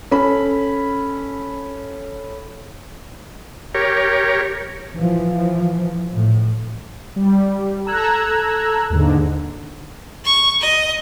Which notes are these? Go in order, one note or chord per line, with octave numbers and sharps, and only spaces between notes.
C#4 A4 B5
G4 A#4 C#5
E3 F3
A2
G3
A4 A#5 E6 F#6 G#6
D#2 G#2 D3
C#6
D#5